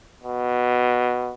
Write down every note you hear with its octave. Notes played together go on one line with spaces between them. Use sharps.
B2